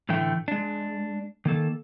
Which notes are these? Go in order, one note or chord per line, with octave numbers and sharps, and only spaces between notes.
A2 D3 E3 A3 G5
G#3 D4
D#3 A#3 A4